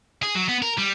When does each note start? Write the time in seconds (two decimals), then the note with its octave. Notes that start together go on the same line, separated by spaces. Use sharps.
0.23 G#4
0.35 F#3
0.48 B3
0.62 A#4
0.78 G3